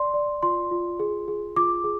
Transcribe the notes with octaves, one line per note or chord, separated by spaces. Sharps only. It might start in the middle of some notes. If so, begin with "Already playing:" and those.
Already playing: D5 C6
D5
F4 C6
F4
G#4
G#4
F4 D6
G#4